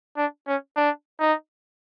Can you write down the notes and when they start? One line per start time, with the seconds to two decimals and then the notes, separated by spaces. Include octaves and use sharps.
0.17 D4
0.47 C#4
0.76 D4
1.20 D#4